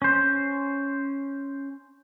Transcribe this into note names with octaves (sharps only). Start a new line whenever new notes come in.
C#4 C5